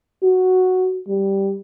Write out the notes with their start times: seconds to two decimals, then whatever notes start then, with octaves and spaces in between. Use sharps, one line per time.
0.24 F#4
1.08 G3